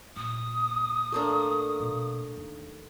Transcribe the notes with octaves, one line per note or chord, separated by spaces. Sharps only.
A#2 D#6
A3 A#3 D4
B2 B3
D#2